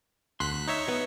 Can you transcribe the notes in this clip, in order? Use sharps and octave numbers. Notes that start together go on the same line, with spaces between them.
D2 C6 F#6 B6
D#4 C#5 E5
B3